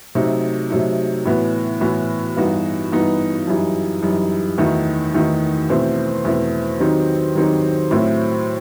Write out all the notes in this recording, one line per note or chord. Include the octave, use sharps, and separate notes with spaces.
C3 F#3 A3 D#4
C3 F#3 A3 D#4
A2 E3 B3 F#4
A2 E3 B3 F#4
G2 E3 B3 D#4 F#4
G2 E3 B3 D#4 F#4
F#2 E3 G3 D#4
F#2 E3 G3 D#4
E2 D#3 A3 D#4 F#4
E2 D#3 A3 D#4 F#4
E2 B2 A3 C4
E2 B2 A3 C4
D#3 F#3 C4 D#4 G4
D#3 F#3 C4 D#4 G4
A2 F#3 A3 C4 E4